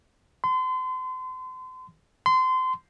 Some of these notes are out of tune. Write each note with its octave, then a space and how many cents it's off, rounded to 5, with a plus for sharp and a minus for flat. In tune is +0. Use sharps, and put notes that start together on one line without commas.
C6 -35
C6 -25